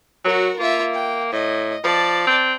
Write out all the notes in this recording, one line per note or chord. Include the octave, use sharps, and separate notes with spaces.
F#3 F#4 A#4
A#3 F4 E5
G5
A2 D#5
F3 D5 A5
C4